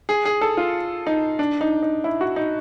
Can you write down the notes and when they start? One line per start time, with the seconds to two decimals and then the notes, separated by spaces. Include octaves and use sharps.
0.09 G#4
0.25 G#4
0.41 A4
0.57 F4
1.07 D#4
1.39 D4
1.61 D#4
1.82 D#4
2.04 E4
2.21 F#4
2.36 D#4